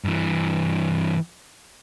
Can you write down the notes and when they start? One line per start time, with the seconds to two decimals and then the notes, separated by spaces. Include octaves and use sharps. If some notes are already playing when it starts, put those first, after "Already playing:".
0.04 G2 E3